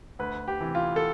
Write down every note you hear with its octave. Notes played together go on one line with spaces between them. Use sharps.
D2 B4
G4
C3 E3
F4
A4